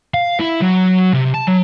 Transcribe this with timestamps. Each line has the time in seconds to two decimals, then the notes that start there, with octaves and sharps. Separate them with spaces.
0.14 F5
0.40 E4
0.62 F#3
1.13 C3
1.34 A5
1.47 F#3